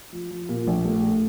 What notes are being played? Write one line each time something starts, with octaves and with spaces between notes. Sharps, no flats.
F3
F3
A#2
A#1
A3
A3